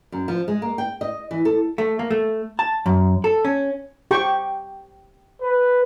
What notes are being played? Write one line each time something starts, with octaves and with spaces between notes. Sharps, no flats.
F#2
F3
G#3
A#3
G5
D#5
E3
A4
A3
A#3
A3
A5
F#2
A4
C#4
G4 G5 C#6
B4